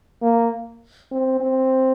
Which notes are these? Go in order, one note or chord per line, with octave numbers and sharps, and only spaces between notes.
A#3
C4
C4